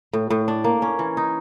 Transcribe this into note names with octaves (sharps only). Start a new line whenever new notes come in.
A2
A2
D4
A#3
C#4
E3
D#4